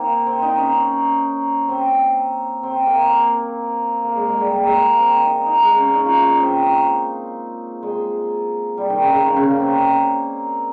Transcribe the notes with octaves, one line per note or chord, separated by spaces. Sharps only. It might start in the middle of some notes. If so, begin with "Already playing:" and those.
Already playing: A#3 C4 D#4
C4
D#4
C#4
C4
C4
A#3
A#3
A#3
G#3
G#3
G3
A#3
G#3
A#3
A#3
C4
D#4
D#4
G#3
C#4
D#4
F4
F4
D#4
C4
G#3
G3
D#3
C#3
C#3
D#3
C#3
A#3
C4